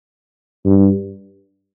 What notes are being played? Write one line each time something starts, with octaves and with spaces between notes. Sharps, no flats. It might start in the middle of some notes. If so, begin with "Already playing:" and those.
G2